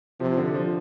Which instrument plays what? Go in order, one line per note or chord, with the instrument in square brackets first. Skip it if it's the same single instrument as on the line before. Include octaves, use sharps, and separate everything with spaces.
[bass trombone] C3 [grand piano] F3
[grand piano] D3
F3